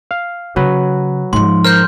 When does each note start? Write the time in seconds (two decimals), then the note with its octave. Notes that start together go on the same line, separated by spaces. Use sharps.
0.11 F5
0.56 C#3 F#3 B4
1.33 G#2 F3 C6
1.64 A#4 C5 F6 G6